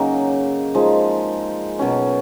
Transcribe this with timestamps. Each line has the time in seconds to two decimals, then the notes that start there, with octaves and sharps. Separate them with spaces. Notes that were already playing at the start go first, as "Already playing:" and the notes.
Already playing: C#3 F#3 A#3 D#4
0.75 F3 G#3 D#4
1.79 B2 F#3 C#4